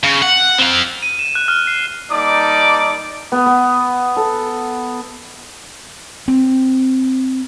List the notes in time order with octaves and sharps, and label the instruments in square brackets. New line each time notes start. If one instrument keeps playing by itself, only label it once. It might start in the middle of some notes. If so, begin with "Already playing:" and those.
[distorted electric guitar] C#3
F#5
C4 F5
[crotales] D#7
E7
F#6
F6
C7
[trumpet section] G3 A#3 D#4 D5 A5 D6
[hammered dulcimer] B3
B3
A4
[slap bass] C4